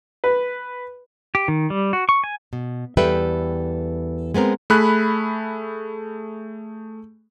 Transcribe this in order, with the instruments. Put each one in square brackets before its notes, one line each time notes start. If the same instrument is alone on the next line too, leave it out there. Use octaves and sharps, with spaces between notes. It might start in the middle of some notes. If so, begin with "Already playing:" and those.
[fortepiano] B4
[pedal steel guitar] G4
D#3
G3
F#4
C#6
G#5
[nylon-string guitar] B2
E2 G3 A4 B4 E5 G5
G#3 B3 C4 A#4
[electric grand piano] A3 G#4 B5 F#6